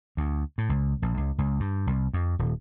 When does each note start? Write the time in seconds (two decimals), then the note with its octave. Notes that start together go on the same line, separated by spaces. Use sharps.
0.17 D2
0.58 A2
0.69 C#2
1.02 A#1
1.17 C#2
1.38 C#2
1.60 G2
1.87 C2
2.13 F2
2.39 D#1